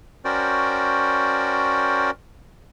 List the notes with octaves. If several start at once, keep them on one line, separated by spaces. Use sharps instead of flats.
C#4 F#4 A#4 C5 D5 G5